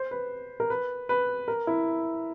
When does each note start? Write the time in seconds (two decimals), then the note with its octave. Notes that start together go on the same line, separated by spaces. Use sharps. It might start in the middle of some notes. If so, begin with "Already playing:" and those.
Already playing: C5
0.11 B4
0.60 A#4
0.70 B4
1.09 B4
1.48 A#4
1.67 E4